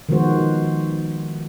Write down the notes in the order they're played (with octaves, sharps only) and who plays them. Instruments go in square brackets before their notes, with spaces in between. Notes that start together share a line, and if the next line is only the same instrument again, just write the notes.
[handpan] D#3 F3 G#3 B3 F#4 C5